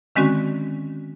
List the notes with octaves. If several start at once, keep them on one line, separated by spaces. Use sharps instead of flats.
D3 D#3 G#3 C4 C#4 F#4